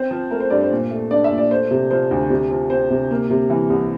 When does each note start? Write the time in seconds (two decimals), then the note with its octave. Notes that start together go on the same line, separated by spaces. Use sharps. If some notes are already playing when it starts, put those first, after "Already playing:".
Already playing: C4 C5
0.11 F3
0.31 A3 A#4
0.40 C5
0.50 G2 D5
0.61 C5
0.71 A#2
0.91 A3
1.11 D4 D5
1.24 E5
1.31 A#2
1.38 D5
1.51 A3 C5
1.71 C3
1.91 F3 C5
2.11 D2
2.30 C3
2.51 F3
2.70 C4 C5
2.90 C3
3.11 A#3
3.30 C3
3.50 E3
3.70 C2